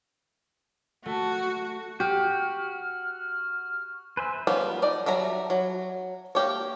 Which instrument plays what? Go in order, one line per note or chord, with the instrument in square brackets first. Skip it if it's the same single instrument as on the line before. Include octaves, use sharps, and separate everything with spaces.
[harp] A3 [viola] F#4
[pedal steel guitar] F#4 [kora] G4 [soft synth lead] F6
[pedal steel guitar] B4 C5 E5 [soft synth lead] G#5
[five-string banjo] F3 G3 A#3 B3 C#4
D#4 D5
F#3 G3 E5 A#5
F#3
A#3 G4 C#5